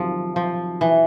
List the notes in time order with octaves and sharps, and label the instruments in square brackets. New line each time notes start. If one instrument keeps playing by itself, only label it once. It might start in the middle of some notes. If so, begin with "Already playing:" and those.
Already playing: [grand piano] C3 D#3 F#3 [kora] F3
[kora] F3
E3